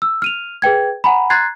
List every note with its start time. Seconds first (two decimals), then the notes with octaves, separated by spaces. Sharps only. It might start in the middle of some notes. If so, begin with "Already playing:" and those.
0.02 E6
0.22 F6 D#7 F7
0.62 G#4 B4 G5 G#6
1.04 F#5 G#5 A#5 B5
1.30 A#5 C6 F#6 G#6 A6 C7